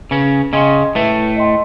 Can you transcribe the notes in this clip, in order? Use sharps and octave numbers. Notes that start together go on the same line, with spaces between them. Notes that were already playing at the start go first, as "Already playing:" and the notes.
C#3 C#4 B4
C#3 C#4 D#5 G5 C6
A2 A3 B4
D#5 G5 C6